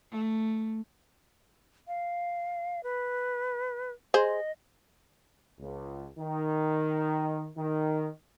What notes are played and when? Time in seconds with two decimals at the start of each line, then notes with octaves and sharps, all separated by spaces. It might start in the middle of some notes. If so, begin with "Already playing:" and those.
0.11 A3
1.88 F5
2.83 B4
4.14 G#4 C5 D#5
5.60 C#2
6.19 D#3
7.58 D#3